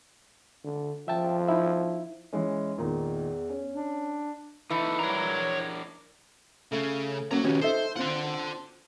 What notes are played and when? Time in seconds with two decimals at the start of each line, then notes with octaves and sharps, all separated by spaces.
0.64 D3
1.08 F3 E5 G5 A5
1.48 D#4 E4 E5
2.33 E3 G#3 C#4
2.78 E2 A#2 D#3 D#4
3.49 C#4
3.73 D4
4.70 E3 D#4 A4
4.99 D4 A#4 C#5 A#5
6.72 C#3 A3
7.31 A#3 C#4 F#4 A#5
7.44 D#3 F3 C#4 F#4 G4
7.61 D#4 A4 C5 E5
7.97 C4 D4 F4 F#5